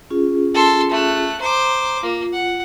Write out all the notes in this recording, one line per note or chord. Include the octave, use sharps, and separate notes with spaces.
C#4 F4 G#4
A4 C6
A3 F#6
C5 A#5 D6
A#3 F4
F#5